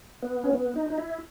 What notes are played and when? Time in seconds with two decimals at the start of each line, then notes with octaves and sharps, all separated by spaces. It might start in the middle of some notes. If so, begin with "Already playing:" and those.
0.23 B3
0.44 C#4
0.53 B3
0.76 D#4
0.90 D#4
0.98 E4